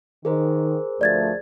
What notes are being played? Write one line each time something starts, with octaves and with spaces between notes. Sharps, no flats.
D#3 G#4 A#4 C5
D2 F3 A3 D5 G#6 A6